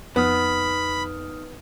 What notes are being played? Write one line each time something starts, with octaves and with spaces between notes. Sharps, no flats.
F2 B3 D#4 B5 D#6 F6